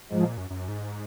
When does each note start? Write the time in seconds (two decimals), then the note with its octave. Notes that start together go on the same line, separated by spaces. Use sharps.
0.12 G#2 F3 G#3
0.25 A#2
0.37 F#2
0.50 F#2
0.68 G#2